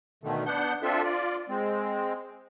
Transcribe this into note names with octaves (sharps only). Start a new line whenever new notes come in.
B2 D3 D#3 A3
B3 D4 F#5 G6
C4 D4 F4 A4 E5
F4 D5
G#3 C4